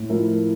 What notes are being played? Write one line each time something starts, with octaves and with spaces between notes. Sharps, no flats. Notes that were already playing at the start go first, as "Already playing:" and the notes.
Already playing: A2
F3 A3 E4 A#4